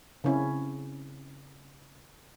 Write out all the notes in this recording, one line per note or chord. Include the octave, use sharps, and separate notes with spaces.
C#3 C4 C#4 E4